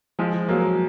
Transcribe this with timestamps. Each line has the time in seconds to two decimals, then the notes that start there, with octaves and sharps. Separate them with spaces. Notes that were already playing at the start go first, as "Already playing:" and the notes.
0.19 F3 G#3
0.49 F#3 A#3